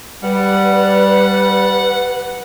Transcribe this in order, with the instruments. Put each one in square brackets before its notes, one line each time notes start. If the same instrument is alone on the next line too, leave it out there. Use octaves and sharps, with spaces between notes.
[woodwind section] G3 [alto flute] B4 [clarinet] F#5